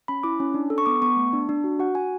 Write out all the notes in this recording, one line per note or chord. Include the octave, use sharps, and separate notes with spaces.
C#4 B5
E4 D6
C#4
D4
A4
C#6
B3 D6
B3 C#6
A3
D4
D4
F#4
F#4 F#5
F#4 G#5